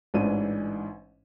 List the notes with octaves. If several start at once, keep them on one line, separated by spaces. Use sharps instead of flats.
A1 G#2 E3 G#3 D4 D#7